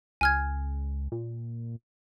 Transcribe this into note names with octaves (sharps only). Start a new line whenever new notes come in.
C#2 G#5 F6 G#6
A#2